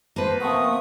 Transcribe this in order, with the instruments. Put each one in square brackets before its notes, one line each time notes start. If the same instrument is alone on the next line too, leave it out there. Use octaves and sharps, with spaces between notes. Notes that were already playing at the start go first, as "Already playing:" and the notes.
[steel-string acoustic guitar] A#3 B4 [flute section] C5 A5
[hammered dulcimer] C3 F3 B3 [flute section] C#6 D#6